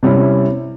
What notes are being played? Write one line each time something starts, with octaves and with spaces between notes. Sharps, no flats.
C3 G3 C#4 E4